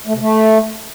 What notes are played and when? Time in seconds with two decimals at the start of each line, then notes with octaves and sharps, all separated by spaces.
0.07 A3
0.14 C3
0.21 A3